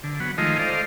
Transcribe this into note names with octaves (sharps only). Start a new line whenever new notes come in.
D3
F#3 B3
D#3 F3 G#3 A3 F4 D#5
A4 C5 D5 D#5 F5